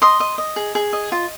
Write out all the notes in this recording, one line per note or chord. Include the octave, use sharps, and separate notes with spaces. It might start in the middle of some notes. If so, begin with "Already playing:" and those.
D#5 C6 D#6
D#5
D#5
G#4
G#4
D#5
F4